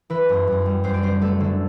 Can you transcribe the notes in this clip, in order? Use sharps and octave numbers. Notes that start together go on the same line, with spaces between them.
E3 B4
F#2
F#2
G3
F#2 C5
D5
F#1 C5
A3 A4
D3